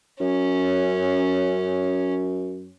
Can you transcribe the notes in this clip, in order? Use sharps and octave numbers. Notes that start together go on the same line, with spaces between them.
F#2 C#4